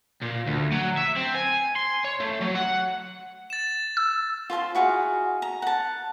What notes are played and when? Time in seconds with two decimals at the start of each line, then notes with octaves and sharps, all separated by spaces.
0.22 A#2
0.46 D2
0.72 F#3
0.97 E5
1.16 C4
1.35 G#5
1.76 C6
2.04 C#5
2.20 A3
2.41 F#3
2.55 F#5
3.50 A6 E7
3.97 E6
4.50 F4 C5 G#5 C6
4.75 E4 F#4 G#4 F5
5.42 A#5
5.62 F#5 A5